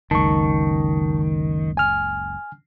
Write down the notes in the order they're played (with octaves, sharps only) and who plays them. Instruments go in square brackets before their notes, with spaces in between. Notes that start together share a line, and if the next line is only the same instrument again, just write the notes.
[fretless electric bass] F#1 C#2 [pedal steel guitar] D#3 [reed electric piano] A5 C#6
[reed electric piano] G#5 F6